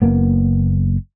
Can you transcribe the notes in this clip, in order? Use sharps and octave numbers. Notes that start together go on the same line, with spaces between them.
F#1 A#3 B3